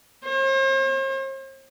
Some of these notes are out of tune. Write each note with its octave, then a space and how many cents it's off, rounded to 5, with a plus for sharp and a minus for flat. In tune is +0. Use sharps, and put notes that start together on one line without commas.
C5 +45